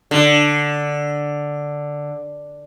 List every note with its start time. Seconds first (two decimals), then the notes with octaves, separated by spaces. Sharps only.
0.11 D3